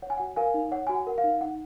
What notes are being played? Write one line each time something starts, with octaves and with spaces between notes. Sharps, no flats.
C#5 F#5
G#5
F#4 F#5
A#4 F5 G#5
D#4
C#5 F#5
F#4 G#5
F#5
A#4 F#5
F5
D#4
D#4 F#5